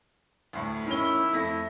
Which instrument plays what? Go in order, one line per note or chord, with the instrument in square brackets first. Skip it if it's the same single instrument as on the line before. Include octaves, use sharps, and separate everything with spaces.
[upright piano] D2 A2
[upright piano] D#3 C#4 G7 [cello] E4
[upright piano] F2 A3 A#6